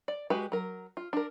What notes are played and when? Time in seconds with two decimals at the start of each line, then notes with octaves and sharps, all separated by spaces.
0.08 D5
0.30 G#3 F#4 G4 B4
0.52 F#3 A#4
0.97 F4
1.13 D4 A#4